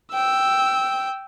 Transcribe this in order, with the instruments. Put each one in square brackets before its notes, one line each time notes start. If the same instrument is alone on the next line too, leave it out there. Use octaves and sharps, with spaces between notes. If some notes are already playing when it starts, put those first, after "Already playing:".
[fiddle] G5 [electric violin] E6